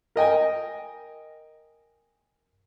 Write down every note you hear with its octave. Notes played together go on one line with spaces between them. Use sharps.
A#4 D#5 G5 G#5